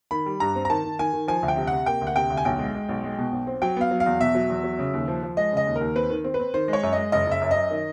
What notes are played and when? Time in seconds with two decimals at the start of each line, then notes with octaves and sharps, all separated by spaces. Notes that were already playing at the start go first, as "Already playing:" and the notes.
0.11 D#3 B5
0.26 G3
0.40 G2 A#5
0.55 C4
0.65 A#5
0.70 D#3 A5
0.84 D#3
0.99 D#3 G#5
1.13 D#3
1.28 F3 G#5
1.43 D2
1.48 G5
1.57 C3
1.67 C3 F#5
1.86 A#3 G5
2.01 D2
2.07 F#5
2.16 C3 G5
2.30 D2
2.37 G#5
2.45 B1 G5
2.59 G#3
2.75 G#3
2.89 B1
3.04 G#3
3.18 B2
3.32 B1
3.47 C4
3.62 F#3 G5
3.77 B3 F5
3.91 F#3
4.00 F5
4.06 E2
4.20 B2 E5
4.35 F#3
4.49 E2
4.64 F#3
4.79 C#3
4.93 D#2
5.08 F3
5.23 F3
5.37 G#3 D#5
5.52 C#3 D#5
5.67 D#2
5.76 A#4
5.81 D#2
5.95 C4 B4
6.10 D#3
6.24 C4
6.34 B4
6.39 C4
6.54 D#3 C5
6.68 G#3
6.73 C#5
6.83 F#2
6.93 G#3 D#5
7.12 F#1 D#5
7.27 F#1 E5
7.41 F#2
7.51 D#5
7.56 F#2
7.71 D#3